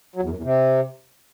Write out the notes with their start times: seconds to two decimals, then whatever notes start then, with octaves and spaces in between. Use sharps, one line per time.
0.16 F#3
0.23 E2
0.30 F#2
0.37 E2
0.44 C3